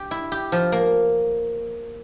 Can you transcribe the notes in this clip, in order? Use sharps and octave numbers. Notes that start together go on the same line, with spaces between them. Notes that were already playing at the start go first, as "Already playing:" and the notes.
Already playing: G4
E4
G4
F3
A#3